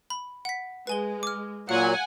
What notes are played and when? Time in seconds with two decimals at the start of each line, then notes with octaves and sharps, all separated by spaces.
0.10 B5
0.45 F#5 B6
0.87 G#3 B4 G#5 G7
1.23 D6 F6
1.69 A#2 F#3 F5 F#5 G#5